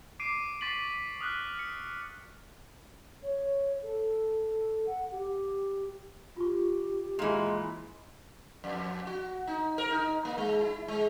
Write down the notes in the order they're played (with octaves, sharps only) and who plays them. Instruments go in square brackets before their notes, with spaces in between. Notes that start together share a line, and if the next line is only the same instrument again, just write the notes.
[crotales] D6 C7 D7 D#7
C#6 A6 B6 C7 F#7
D#6 F6 F#6
C#7
[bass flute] C#5
A4
F#5
G4
[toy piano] F4 C#6 [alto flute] G4
[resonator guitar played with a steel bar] A#2 E3 [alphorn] G#3 [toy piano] D#5
[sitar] F2
F#4
D#4
A#4
D#4
A#3
G#3
E4
G#3